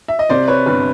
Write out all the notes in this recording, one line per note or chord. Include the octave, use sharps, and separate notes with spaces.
E5
D#5
C3 C5 D5
B4 C#5
G1 B4